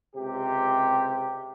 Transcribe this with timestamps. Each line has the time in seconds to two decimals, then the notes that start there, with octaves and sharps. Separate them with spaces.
0.14 C#2 C3 G4